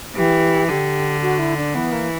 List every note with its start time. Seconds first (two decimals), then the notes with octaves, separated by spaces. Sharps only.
0.16 E3 G4
0.69 D3 G4
1.22 F#4
1.39 E4
1.57 D4
1.75 E3 B3
1.92 A#3